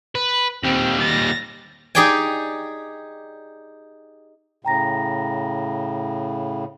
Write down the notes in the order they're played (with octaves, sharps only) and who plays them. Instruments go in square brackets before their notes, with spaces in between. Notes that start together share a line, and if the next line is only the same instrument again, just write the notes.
[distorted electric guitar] B4
[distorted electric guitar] D#2 G3 [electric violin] C4
[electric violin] A6 A#6
[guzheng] D#4 G4 G#4 D5 G5 G#5
[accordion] A2 C#3 [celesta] G5 A#5 A#6